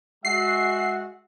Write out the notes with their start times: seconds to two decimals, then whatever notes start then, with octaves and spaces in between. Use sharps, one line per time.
0.25 G#3 F#4 E5 F#5 C7